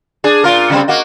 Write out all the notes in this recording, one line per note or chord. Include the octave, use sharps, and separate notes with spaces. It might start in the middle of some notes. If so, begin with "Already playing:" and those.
D4 G#4
A#2 F4 A#4
C#3 G3 C4
A#3 F#4 D#5